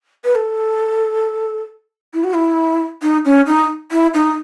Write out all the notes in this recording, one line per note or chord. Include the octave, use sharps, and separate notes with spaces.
B4
A4
E4
F#4
E4
D#4
C#4
D#4
E4
D#4